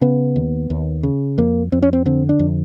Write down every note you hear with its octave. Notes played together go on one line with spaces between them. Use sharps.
C#3 B3
D#2
D#2
C#3
F2 A#3
F2 C4
C#4
C4
D3 C4
D4
F2